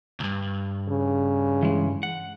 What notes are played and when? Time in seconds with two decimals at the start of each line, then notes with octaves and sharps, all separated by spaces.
0.20 C#2 G2
0.89 C#3
1.63 E3 G#3
2.03 F#5